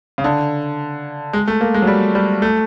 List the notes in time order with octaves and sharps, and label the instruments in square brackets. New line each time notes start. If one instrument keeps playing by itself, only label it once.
[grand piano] C#3
D3
G#3
A3
A#3
G#3
F#3
G3
G3
A3